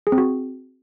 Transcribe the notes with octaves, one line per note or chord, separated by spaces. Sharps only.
G#4
C4
F#4